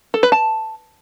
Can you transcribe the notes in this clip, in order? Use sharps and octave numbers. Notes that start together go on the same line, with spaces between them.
A4
B4
A5